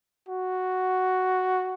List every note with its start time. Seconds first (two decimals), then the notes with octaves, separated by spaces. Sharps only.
0.28 F#4